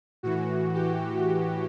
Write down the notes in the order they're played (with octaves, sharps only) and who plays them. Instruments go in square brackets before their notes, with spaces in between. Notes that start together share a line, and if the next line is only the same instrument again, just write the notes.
[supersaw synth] A2 E3 F#4
G4